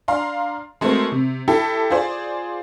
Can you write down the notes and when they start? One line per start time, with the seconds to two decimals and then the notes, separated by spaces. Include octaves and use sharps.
0.08 D4 F5 A#5 C6
0.81 G#3 A3 C4 F#4 A#4 C5
1.12 C3
1.48 E4 G4 A4 G5
1.90 F4 G#4 C5 D5